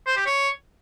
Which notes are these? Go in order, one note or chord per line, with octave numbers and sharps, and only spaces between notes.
C5
G4
C#5